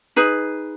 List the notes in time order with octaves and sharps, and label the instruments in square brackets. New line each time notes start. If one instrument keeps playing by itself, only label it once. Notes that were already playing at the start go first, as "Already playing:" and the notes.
[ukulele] D#4 G#4 B4